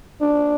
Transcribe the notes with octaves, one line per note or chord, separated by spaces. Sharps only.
D4